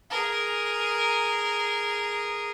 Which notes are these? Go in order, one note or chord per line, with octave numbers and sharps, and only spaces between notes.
G#4 A#4